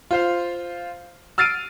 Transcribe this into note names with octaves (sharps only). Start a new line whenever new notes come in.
F4 C5 F5
E6 F6 A6 C7 D7 D#7